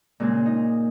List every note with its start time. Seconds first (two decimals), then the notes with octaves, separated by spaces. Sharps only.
0.20 A#2 C#3 G#3 C4 G#4
0.46 D#4